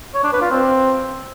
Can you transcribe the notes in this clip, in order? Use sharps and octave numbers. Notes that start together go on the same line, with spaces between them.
C#5
D4
B4
F4
C4